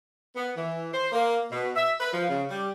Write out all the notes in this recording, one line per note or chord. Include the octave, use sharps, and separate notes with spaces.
B3
E3
C5
A#3
B2
E5
B4
F3
C#3
G3